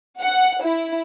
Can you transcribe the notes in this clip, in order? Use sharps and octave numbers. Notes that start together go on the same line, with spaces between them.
F#5
E4